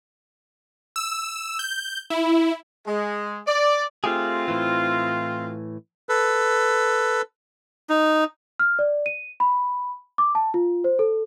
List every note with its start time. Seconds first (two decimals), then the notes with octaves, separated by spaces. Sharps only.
0.96 E6
1.59 G6
2.10 E4
2.87 G#3
3.47 D5
4.04 A3 C4 F4 G4 G#4
4.48 A2 E3
6.09 A4 B4
7.90 D#4
8.59 F6
8.79 D5
9.06 D#7
9.40 B5
10.18 D6
10.35 A5
10.54 F4
10.84 C5
10.99 A4